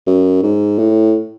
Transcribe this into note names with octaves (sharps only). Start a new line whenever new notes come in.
F#2
G#2
A2